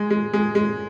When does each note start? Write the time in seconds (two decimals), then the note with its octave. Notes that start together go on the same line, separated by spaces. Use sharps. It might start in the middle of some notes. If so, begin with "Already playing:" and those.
Already playing: G#3
0.10 G#3
0.33 G#3
0.55 G#3